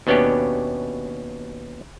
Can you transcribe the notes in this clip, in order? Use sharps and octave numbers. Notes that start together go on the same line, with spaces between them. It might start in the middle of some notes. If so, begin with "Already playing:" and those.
D#2 B2 B3 C#4 D4 G4